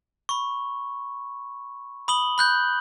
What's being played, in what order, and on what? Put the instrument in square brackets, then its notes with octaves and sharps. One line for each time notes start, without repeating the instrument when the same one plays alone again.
[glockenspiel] B5 C#6
B5 D#6 F#7 G7
B5 F#6 G6